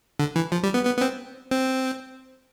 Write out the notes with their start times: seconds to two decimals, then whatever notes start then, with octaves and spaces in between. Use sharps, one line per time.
0.19 D3
0.36 E3
0.52 F3
0.63 G3
0.74 B3
0.85 B3
0.97 B3
1.01 C4
1.51 C4